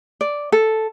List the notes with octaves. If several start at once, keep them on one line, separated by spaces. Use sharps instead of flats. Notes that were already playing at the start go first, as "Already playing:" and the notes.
D5
A4